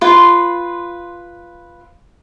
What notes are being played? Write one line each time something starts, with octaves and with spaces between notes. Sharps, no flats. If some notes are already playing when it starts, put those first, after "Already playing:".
F4 B4 C6